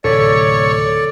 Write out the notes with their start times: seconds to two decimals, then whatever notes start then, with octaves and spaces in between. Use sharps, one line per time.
0.04 D1 C3 A4 C#5 D5